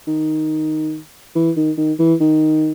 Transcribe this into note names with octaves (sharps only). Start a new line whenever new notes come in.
D#3
E3
D#3
D#3
E3
D#3